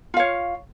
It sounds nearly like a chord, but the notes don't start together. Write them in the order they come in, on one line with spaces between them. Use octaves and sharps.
F4 F5 C#5